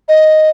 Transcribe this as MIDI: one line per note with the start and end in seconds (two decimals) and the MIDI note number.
0.08 0.49 75